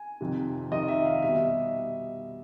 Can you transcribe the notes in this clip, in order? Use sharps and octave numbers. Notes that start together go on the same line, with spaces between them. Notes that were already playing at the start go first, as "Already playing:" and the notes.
Already playing: G#5
F2 C3 D#3
F2 C3 D#3 D#5
E5
F5
B2 G3 E5